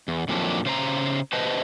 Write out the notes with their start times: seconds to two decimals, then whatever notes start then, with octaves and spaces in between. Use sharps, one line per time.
0.08 E2
0.29 F2 A#2 D#3 F#3 D4
0.65 C#3 C5 D#5 A#5
1.33 B4 C5 D#5 A5